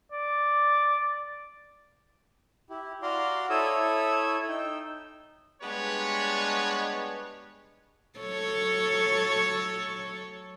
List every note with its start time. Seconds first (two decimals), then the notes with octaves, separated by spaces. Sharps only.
0.12 D5
2.70 E4 G4
3.02 F#4 D5 F5 A#5 C6 D6
3.50 E4 A4 C#5 E5 D#6 E6
4.48 D#4 G5 E6
5.62 G3 G#3 B3 D4 B4 C#5
8.19 F#3 A4 C#5